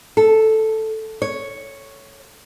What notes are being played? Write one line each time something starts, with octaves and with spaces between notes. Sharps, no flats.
A4
C#5